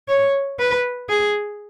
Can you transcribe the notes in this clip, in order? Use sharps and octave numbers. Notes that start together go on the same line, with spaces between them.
C#5
B4
G#4